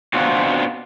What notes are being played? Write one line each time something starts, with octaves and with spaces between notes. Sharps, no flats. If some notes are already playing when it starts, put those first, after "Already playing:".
B3 C4 D4 F4 F#4